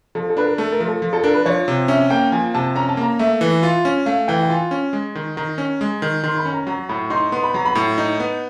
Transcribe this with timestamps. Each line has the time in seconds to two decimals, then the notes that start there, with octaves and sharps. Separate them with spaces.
0.15 F3 A4
0.30 A4
0.37 D4 B4
0.44 A#4
0.58 A3 A4
0.72 A#4
0.80 F3
0.88 A4
1.02 F3
1.13 A4
1.24 D4 A#4
1.34 B4
1.46 F3 C#5
1.68 C3
1.88 C#4 E5
2.10 A#3 G5
2.32 F3 G#5
2.54 C3 A5
2.76 C#4 A#5
2.89 A5
2.97 A#3 A#5
3.19 A3 E5
3.41 E3
3.63 F4
3.85 C#4
4.06 A3 F5
4.28 E3 G5
4.43 G5
4.49 F4 G#5
4.71 C#4
4.93 G#3
5.15 D#3
5.37 D#3 A#5
5.58 C#4
5.81 G#3
6.02 D#3
6.24 D#3 C6
6.38 B5
6.46 C#4
6.53 A#5
6.67 F#3 A#5
6.89 A2 B5
7.10 D#4 C6
7.32 B3 C6
7.43 B5
7.54 F#3 A#5
7.65 B5
7.75 A2
7.98 D#4
8.20 B3